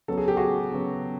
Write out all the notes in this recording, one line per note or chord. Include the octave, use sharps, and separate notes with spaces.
C#3 F#3 B3 A4
G#4
G4
F#4 G#4
C#3 F#3 B3